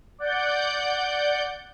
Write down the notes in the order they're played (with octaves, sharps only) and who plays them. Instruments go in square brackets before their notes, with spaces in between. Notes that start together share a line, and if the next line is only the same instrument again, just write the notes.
[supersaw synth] D5 F#5 G6